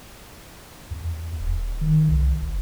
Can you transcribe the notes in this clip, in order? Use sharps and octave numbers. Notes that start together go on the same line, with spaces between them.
E2
D#1
D#3
C2
F#1